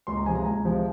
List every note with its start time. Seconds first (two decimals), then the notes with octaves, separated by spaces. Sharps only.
0.07 C#2 C6
0.17 A#5
0.26 C3 F3 G#3 G#5
0.35 A#5
0.45 C#2 G#5
0.65 C3 F3 G#3